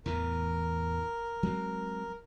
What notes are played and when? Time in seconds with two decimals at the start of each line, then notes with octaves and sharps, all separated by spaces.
0.06 E2 A2 E3 A#4
1.43 F#3 G#3 C4